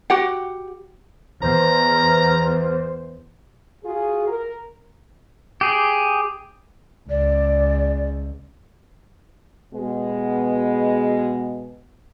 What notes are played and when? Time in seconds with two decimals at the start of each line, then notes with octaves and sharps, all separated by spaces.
0.10 F#4 G4 F#5
1.42 E2 C5 A#5
3.85 F4 F#4 G#4
4.27 A#4
5.61 G4 G#4
7.09 C#2 D5
9.74 B2 G#3 B3